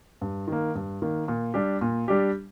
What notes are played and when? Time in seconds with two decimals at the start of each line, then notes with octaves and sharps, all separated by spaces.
0.21 G2
0.48 D#3 A#3
0.75 G2
1.02 D#3 A#3
1.28 A#2
1.54 G3 D4 G4
1.81 A#2
2.08 G3 D4 G4